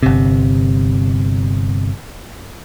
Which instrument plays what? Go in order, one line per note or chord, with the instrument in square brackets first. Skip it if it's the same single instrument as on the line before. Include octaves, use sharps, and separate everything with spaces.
[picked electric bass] G1 C3